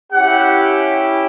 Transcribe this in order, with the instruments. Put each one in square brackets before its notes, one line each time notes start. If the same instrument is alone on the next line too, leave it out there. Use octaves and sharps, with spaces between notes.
[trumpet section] C#4 E4 G4 F#5